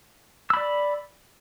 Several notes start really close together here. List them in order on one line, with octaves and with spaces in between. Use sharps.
E6 B5 D5